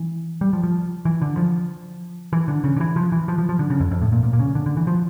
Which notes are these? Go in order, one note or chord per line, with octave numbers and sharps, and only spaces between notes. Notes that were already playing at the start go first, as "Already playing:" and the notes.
Already playing: E3
G3
F3
F3
E3
D3
F3
E3
D3
C#3
D3
E3
F3
E3
F3
F3
F3
D3
C#3
F2
F2
A2
A#2
A#2
A#2
C#3
D3
D3
E3
F3